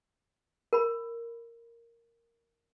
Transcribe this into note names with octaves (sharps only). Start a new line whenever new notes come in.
A#4 B5